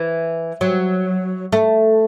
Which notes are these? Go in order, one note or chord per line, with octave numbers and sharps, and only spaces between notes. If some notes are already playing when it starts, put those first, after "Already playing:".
Already playing: E3
F#3
A3